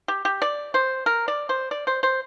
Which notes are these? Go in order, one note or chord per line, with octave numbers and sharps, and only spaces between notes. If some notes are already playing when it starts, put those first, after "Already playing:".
G4
G4
D5
C5
A#4
D5
C5
D5
C5
C5